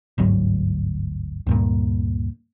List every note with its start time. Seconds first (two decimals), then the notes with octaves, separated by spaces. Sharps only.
0.18 G1 D2 G#2 F#3
1.47 D2 G2 A#2